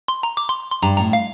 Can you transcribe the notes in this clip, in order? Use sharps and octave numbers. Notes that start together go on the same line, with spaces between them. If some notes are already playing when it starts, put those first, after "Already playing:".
C6
A#5
D6
C6
C6
G2 A#5
A2 A#5
F5